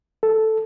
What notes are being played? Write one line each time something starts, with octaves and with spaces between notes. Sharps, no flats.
A4